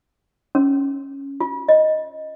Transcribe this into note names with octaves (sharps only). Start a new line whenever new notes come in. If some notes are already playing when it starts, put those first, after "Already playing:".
C#4
F4
D#5